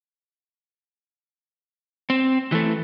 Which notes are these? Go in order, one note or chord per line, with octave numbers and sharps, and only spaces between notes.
C4
E3 A3